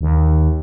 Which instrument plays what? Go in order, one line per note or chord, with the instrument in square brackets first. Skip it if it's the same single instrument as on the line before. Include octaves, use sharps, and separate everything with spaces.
[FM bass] D#2